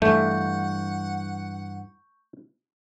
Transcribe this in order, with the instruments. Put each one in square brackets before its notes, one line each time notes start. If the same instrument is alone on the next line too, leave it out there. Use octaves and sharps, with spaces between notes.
[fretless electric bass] G2 E3 [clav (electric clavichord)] A3 [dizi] F#5 [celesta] C#6 G6